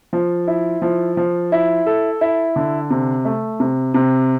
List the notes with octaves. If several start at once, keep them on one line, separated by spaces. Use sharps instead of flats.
F3
E4
F3
F3
E4
A4
E4
D3
C3
A3
C3
C3